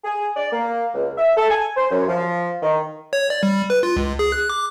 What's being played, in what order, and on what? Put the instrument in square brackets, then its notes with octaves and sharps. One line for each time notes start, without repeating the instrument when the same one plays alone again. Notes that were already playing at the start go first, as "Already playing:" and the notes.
[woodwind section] G#4
D5
A#3
C#2
E5
A4
G#5
C5
F#2
F3
D#3
[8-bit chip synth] C#5
D5
G3
B4
F4
C#2
G#4
F#6
D6